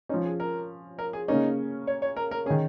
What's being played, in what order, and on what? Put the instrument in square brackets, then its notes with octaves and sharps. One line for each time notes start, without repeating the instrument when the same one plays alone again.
[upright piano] F3 C#4 [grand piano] D#4
[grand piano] G#4
A#4
A#4
G#4
[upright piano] C#3 A#3 C#4 [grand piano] D#4
[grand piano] C#5
C#5
A#4
A#4
[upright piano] C#4 [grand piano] G#4
[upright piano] D#3